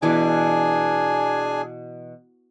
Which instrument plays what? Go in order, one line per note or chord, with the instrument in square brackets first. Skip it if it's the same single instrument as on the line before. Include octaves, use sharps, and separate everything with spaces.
[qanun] B2 E3 D6 [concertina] D4 G#4 G#5